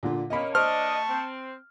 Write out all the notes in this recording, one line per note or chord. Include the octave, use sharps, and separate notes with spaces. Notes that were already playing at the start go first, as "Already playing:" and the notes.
A#2 D3 F4
A#3 C#4 D#5 B5
D4 C5 D#5 A5 C#6 F6
C4